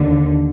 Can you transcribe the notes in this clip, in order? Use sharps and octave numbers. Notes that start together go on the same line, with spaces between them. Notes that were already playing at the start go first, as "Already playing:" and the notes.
Already playing: D#2 D3